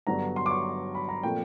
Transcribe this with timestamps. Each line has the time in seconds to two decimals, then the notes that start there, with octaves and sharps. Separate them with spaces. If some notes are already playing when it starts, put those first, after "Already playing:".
0.07 G2 D3 F#3 B3 D4 A#5
0.36 C6
0.46 D6
0.51 C#6
0.95 B5
1.09 A#5
1.23 A#2 F3 A3 C4 G5